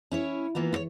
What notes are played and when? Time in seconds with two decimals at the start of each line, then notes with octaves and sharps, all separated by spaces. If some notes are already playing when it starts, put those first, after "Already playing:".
0.11 C#4 E4 C#5
0.55 E3 A#3 B3 F4
0.73 E4 C#5